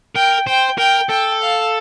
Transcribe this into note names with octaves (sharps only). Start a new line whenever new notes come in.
A#4 G5
C5 G5
A#4 G5
A4 G5
F5